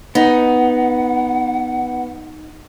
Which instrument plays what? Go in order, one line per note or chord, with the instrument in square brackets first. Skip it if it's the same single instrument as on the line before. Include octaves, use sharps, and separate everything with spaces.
[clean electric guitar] B3 [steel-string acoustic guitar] D#4 [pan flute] F#5